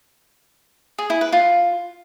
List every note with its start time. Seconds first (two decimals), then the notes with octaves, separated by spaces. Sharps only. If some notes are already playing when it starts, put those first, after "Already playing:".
0.98 G#4
1.10 E4
1.21 B4
1.32 F4